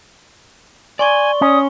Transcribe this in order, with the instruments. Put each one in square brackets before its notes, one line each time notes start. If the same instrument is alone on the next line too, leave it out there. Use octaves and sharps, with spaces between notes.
[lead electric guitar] D5 [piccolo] G#5 [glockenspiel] C6 C#6 G7
[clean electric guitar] C#4 [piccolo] D#6